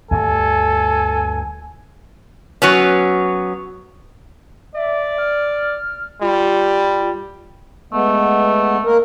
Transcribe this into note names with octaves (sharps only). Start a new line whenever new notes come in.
D2 G2 A4 G#5
F#3 B3 C#4
D5 E5
F6
G3 F4
G#3 A3 B3
A#3 A#4